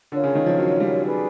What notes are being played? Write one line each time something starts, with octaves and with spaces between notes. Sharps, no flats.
D3 F4 A#4 C#5 F5
C#3
D#3
F3
F#3
G3
G#4 B4 D5